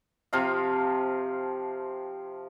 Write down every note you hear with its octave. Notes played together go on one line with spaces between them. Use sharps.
C3 F3 F5